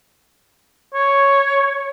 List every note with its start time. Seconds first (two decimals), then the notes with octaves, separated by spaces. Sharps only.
0.94 C#5